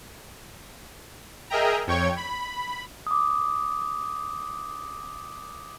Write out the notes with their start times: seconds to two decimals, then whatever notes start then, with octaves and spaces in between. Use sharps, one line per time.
1.50 G#4 A#4 D#5 E5 G5 A#5
1.87 F2 C#5 G5 C#6 G#6
2.17 B5
3.07 D6 D#6